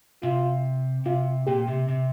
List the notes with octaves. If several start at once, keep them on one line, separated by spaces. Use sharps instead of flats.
C3 F4
C3 F4
A#2 G4
C3
C3